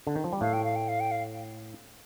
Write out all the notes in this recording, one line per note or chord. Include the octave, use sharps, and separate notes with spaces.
D3
D#3
F3
G3
A2 A3 F5
G5
F5
G5
F5
G5
F5